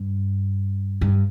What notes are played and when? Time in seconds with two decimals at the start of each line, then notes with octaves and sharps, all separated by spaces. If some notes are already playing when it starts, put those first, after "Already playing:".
Already playing: G2
1.01 G2